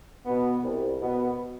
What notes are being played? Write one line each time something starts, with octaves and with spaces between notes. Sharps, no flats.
B2 B3
C2
B2 B3